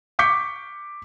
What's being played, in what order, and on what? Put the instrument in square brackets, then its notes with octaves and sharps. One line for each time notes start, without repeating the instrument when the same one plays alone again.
[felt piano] C#6 D6 G6 B6 C#7